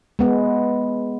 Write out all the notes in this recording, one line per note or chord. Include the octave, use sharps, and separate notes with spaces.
G#3 B3